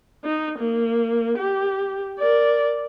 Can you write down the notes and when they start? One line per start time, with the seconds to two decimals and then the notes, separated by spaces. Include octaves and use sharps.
0.25 D#4
0.58 A#3
1.38 G4
2.19 A#4 D5